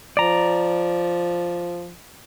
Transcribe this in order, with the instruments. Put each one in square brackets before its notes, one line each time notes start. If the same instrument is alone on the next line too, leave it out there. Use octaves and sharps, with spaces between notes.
[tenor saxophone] F3 [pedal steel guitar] D5 A#5